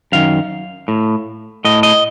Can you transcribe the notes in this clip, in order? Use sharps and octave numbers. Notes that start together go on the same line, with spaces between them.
F#2 D#3 F5
A2
A2 D#5
D#5